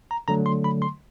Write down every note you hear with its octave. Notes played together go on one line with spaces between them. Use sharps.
A#5
D3 F#3 A3 A#5
C6
B5
C6